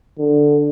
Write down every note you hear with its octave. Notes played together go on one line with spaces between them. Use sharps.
D3